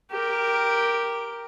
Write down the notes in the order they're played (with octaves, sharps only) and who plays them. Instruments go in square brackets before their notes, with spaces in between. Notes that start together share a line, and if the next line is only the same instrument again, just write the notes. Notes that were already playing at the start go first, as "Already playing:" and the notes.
[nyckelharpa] G4 A#4